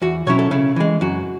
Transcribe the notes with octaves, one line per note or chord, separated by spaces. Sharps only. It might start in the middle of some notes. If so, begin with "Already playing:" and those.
E2 F#4
B2 F#3 C#4 E4 C#5
A4
C#3 E4
E3 G#3
F#2 F#4